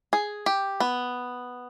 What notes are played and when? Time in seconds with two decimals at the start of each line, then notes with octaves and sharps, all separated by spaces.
0.13 G#4
0.46 G4
0.80 B3